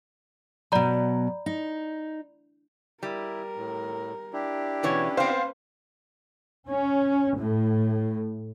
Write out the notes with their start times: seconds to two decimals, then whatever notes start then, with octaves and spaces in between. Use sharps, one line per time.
0.72 B2 F#3 D5 A#5 B5
1.46 D#4
3.03 G3 E4 A#4
3.57 A2
4.33 D4 E4 G4
4.83 B2 E3 C#4 B4 C#5
5.17 B3 C4 C5 F5
6.68 C#4
7.38 A2